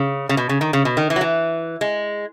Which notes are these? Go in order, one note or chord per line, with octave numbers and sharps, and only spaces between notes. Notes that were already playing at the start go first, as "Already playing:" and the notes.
Already playing: C#3
C#3
B2
C#3
D#3
C#3
B2
D#3
E3
F#3
E3
G#3